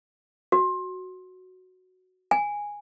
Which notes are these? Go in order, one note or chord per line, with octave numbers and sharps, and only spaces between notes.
F#4
G#5